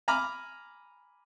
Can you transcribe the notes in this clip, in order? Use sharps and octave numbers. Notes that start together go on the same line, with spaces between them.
G#5 A#5 B5 D6 F6